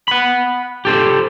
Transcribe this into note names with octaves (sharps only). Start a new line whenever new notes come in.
F#5 B5
G4 A4 C5